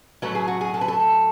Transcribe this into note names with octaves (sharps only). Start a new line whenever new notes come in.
A2 F#3 A3 B4
G#4
F#4
G#4
A4
B4
A4